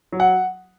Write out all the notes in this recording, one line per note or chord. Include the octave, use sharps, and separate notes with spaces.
F#3
F#5